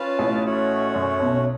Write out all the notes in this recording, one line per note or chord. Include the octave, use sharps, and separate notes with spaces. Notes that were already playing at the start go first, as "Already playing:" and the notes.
Already playing: C#4 F4 B4 F5 A5
A1 A2
A3 C#4 F#4 C#5 F#5
F#2
B1 B2